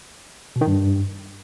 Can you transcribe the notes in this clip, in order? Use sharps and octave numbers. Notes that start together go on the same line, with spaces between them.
B2
D#3
G2